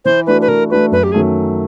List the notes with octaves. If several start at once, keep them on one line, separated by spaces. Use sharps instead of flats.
E3 C5
A3 D4 F#4 B4
B4
E3 A#4
A3 D4 F#4 B4
F#2 B4
G4
D#3 F#3 A3 C#4 G#4